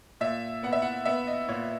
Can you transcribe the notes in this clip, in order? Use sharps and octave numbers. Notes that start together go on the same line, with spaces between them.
A#2 E5
B3 F#5
E5
F#5
B3 E5
D#5
A#2 C#5